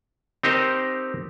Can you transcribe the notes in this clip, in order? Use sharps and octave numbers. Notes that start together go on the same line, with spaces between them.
C4 D#4 G4 A#4 C5 D#5